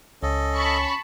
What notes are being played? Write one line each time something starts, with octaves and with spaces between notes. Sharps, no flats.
C#2 C#4 A4 D#5
A5 B5 C#6